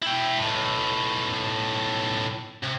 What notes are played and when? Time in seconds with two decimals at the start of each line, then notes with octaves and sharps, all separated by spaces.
0.02 E4 G5
0.39 B1 A2
2.64 C3